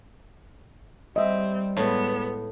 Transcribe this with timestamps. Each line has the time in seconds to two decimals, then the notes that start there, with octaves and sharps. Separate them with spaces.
1.16 G3 C4 D#5 E5
1.77 A2 G#3 B3